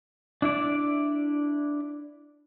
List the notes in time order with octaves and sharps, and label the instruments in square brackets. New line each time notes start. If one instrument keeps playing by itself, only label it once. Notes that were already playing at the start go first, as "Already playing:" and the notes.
[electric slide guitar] D4 E4 D5